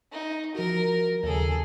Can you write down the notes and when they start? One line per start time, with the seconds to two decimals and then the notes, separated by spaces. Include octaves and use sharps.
0.12 D#4
0.55 F3 F#4 A#4
1.23 D#2 C#3 G#4 A4